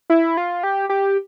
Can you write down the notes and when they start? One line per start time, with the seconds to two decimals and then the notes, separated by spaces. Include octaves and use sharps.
0.10 E4
0.37 F4
0.63 G4
0.89 G4